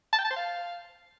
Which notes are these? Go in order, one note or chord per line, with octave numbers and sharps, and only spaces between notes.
A5
G5
A5
C5
F5